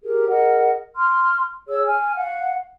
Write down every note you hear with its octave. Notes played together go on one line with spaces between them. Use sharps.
G4 G#4 A#4
G#4 A#4 D#5 F#5
C6 F6
G#4 C#5 E6
G#5 F6
F5 F#5